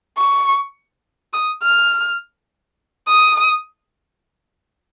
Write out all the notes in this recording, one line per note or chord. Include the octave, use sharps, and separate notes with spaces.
C#6
D#6
F6
D#6